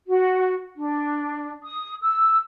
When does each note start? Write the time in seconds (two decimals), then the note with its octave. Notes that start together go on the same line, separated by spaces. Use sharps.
0.08 F#4
0.76 D4
1.64 D#6
2.01 E6